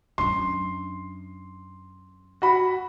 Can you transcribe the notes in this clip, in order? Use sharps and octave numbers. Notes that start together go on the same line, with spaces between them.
F#2 D4 C6
F#4 B5